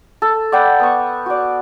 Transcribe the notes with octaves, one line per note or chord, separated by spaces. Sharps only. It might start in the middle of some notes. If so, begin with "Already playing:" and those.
A4
D5 F#5 G5 B5
B3 C#6
F#4 D5